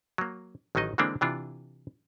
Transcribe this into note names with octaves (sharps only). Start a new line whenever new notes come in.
F#3 A#3
A1 D#3 F#3 D#4 D#5
D3 E3 G#3 A#3 C4 D4
C3 E3 D4 F4